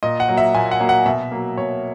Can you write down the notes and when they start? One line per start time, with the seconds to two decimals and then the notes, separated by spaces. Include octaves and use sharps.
0.03 A#2 D#5
0.20 F#5
0.28 F#3 A#3
0.37 E5
0.54 A#2 G#5
0.71 F#5
0.80 F#3 A#3
0.89 F#5
1.05 B2 E5
1.32 F#3 A#3
1.57 B2 C#5